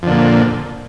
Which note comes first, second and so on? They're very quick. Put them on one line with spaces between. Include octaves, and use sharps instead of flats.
F2 D3 A#2